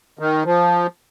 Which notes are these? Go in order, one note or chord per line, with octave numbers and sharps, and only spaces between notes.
D#3
F3